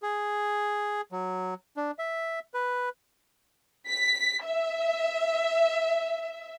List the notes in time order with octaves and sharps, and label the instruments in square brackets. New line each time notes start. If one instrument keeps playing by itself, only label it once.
[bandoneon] G#4
F#3
D4
E5
B4
[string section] B6
E5